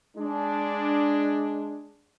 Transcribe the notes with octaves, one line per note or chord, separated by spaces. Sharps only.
G#3 D4